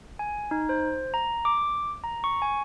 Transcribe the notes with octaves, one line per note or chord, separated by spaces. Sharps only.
G#5
D#4
C5
A#5
D6
A#5
C#6
G#5